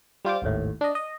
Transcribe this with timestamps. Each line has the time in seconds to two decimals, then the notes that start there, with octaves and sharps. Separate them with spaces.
0.25 G3 F4 C5 D6
0.42 G#1 D#2 A2
0.81 D4 D#5
0.95 D#5